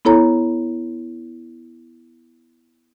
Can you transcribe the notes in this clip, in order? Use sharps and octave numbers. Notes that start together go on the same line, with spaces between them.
B3 E4 A4 C#5 A#5